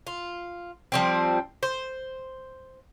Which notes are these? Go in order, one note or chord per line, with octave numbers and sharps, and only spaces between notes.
F4
F3 G3 C4
C5